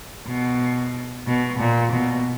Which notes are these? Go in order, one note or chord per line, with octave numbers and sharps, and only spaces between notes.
B2
B2
A#2
B2